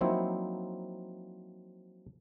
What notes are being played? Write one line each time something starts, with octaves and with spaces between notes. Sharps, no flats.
F3 F#3 A#3 C4 D#4 E4